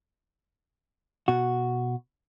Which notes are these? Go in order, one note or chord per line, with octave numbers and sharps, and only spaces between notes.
B2 F#4